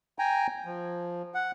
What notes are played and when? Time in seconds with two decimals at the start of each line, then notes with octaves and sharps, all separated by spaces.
0.19 G5 G#5 A#5
0.65 F3
1.34 F#5